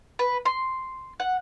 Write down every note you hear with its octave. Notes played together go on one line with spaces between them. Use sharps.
B4
C6
F#5